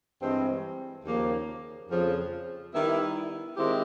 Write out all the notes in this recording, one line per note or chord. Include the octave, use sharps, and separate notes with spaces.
G2 E3 G#3 C4
D#2 C#3 F3 A#3
F2 C#3 F3
D#3 G3 B3 E4
D#3 G#3 C4 E4 G4